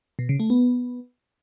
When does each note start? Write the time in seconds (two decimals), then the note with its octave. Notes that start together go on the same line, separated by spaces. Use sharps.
0.19 B2
0.29 C#3
0.40 A3
0.50 B3